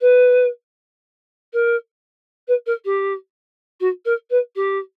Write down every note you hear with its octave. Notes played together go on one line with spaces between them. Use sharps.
B4
A#4
B4
A#4
G4
F#4
A#4
B4
G4